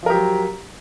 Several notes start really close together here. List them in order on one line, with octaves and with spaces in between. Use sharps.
F3 A#4 G4 F#3